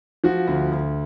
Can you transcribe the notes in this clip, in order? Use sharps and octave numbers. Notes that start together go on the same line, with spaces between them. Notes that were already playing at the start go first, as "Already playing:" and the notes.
F3 F#4
D2
D2